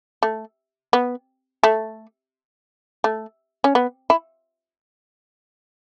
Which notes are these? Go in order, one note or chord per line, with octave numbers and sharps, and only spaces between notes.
A3
B3
A3
A3
C#4
B3
E4